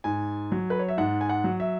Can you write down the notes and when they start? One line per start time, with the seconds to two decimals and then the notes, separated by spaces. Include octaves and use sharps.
0.04 G#2 G#5
0.52 F#3
0.70 B4
0.79 C#5
0.89 E5
0.98 G#2 F#5
1.21 G#5
1.29 F#5
1.44 F#3
1.60 E5